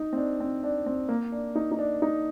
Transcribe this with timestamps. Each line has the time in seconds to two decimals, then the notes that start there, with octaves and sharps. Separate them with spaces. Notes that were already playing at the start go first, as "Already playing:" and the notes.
Already playing: D#4
0.13 C4
0.16 D4
0.40 C4
0.63 D4
0.86 C4
1.09 A#3
1.32 D4
1.55 D#4
1.72 D#4
1.79 D4
2.02 D#4